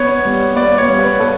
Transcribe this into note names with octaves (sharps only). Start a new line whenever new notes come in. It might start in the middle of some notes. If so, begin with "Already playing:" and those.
Already playing: B3 C#5
G3
B3 D5
C#5
G3
B4
B3 A4